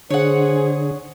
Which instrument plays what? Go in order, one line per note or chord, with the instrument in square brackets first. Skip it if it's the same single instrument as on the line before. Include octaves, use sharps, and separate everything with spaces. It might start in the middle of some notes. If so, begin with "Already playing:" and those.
[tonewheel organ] D3 [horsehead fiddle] G#4 [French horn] C5 [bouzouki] C#5 F#5